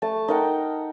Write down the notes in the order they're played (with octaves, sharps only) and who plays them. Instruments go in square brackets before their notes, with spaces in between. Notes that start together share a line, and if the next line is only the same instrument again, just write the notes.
[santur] A3 A5
D#4 A#4 F#5 G5